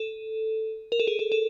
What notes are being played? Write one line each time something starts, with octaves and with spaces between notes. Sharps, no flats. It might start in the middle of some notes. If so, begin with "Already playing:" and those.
Already playing: A4
A#4
A4
G#4
A4
A4